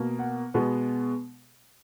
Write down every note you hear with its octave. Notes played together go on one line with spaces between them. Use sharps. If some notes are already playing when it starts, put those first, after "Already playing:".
Already playing: B2 A#3
F#5
B2 G#3 B3